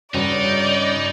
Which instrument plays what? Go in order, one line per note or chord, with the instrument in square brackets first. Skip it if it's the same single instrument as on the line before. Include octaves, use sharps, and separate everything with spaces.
[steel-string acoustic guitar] G2 C#3 [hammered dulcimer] C#4 F#4 B4 [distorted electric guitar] D#4 [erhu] D5